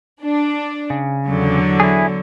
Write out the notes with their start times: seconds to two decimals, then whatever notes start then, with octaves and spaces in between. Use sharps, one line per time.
0.23 D4
0.90 C#3
1.28 E2 D3 F#3
1.80 E4 G#4